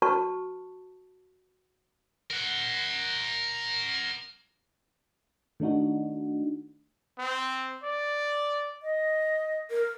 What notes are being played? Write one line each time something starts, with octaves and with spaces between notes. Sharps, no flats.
F#4 B4 A5 C#6
A#4 F#5
D#3 A3 D4 D#4 F#4
C4
D5
D#5
A#4